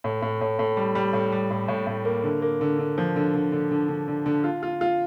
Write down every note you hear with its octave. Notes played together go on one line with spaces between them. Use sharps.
A2
A2
A2
A2
G3
G3
A2
G3
A2
A2
A2
A#3
D3
A#3
D3
D3
F3
D3
D3
D3
D3
D3
D3
D3
F4
F4
F4